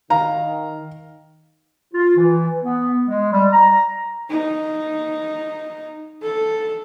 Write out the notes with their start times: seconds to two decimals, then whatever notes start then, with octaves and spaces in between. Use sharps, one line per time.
0.10 D#3 F5 A#5
1.94 F4
2.17 E3
2.63 B3
3.07 G#3
3.33 G3
3.53 A#5
4.30 D#4
6.22 A4